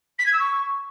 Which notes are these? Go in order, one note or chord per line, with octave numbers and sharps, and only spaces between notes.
B6
G#6
E6
C#6